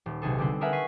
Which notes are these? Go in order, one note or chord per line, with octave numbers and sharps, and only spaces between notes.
D#1
B1 C3 G#4 A4
D3 G3 C4
G#4 A#4 B4 E5 F#5 G#5
C#6 B6 C7 D#7